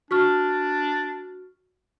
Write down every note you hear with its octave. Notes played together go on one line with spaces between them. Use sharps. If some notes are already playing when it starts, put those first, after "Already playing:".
D4 F#4 C#6 F6